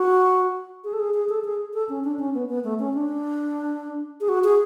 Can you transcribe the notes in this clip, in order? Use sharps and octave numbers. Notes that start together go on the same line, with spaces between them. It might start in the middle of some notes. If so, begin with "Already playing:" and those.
Already playing: F#4
G#4
A4
G#4
G#4
A4
G#4
A4
C#4
D4
C#4
B3
B3
A3
C#4
D4
G#4
F#4
G#4